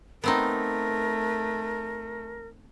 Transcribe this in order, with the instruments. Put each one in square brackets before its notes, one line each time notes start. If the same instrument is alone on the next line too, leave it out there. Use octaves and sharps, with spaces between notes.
[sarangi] A3 [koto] B3 C4 D#4 [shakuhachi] A#4